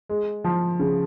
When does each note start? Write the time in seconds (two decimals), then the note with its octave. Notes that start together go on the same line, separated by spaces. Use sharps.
0.09 G#3
0.44 F3
0.80 C#3